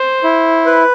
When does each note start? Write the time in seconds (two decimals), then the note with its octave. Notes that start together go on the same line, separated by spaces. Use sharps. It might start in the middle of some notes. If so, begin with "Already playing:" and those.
Already playing: C5
0.24 E4
0.66 B4